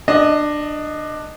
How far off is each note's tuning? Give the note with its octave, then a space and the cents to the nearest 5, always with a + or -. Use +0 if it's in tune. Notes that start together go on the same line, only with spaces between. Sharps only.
D4 +20 D#5 +0